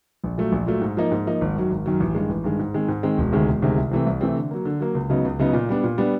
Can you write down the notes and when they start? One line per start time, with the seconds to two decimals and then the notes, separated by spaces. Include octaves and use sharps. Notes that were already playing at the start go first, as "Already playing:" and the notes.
0.24 A#1
0.38 A#2 F#3 A3
0.52 A#1
0.67 A#2 F#3 A3
0.81 G#2
0.97 F3 A#3 D#4
1.11 G#2
1.27 F3 A#3 D#4
1.41 G#1
1.56 F#2 D#3 F#3
1.70 G#1
1.86 F#2 D#3 F#3
2.00 A1
2.15 G2 D#3 G#3
2.29 A1
2.44 G2 D#3 G#3
2.59 G#2
2.74 D#3 G#3 C4
2.88 G#2
3.03 D#3 G#3 C4
3.18 E1
3.32 D2 C3 D#3 G#3
3.48 E1
3.62 D2 C3 D#3 G#3
3.77 C2
3.91 C3 E3 A3 C4
4.06 C2
4.21 C3 E3 A3 C4
4.36 D3
4.51 F#3 A#3
4.65 D3
4.80 F#3 A#3
4.95 C#2
5.09 C#3 F#3 B3 D#4
5.25 C#2
5.39 C#3 F#3 B3 D#4
5.53 A#2
5.69 G3 B3 D4
5.84 A#2
5.98 G3 B3 D4